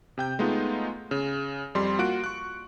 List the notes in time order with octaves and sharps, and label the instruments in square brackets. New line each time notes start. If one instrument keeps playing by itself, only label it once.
[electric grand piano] C3 G5 G6
G#3 A3 B3 D#4 F4
C#3
F2 G3 C6
A#3 F4 F#4 F#6 D7
C#6 F#6